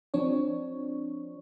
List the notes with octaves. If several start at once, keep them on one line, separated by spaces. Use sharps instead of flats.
F3 C4 D4 C#5